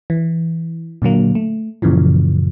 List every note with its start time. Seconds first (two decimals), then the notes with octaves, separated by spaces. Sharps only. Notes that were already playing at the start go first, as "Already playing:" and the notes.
0.10 E3
1.02 A#2 D3 F#3 A#3
1.35 A3
1.82 F#2 A#2 C#3 E3 F3